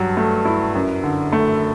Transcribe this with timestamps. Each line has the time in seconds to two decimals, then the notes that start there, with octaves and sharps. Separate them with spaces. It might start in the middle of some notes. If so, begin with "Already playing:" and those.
Already playing: G2 F#3
0.17 A3
0.45 E4
0.75 F#2
1.04 D3
1.32 A3